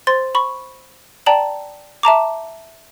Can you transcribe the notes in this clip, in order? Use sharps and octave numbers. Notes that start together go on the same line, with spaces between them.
C5 C6 A6
B5 C#6
D5 G5 A5 A#5 F#7
E5 A5 A#5 D6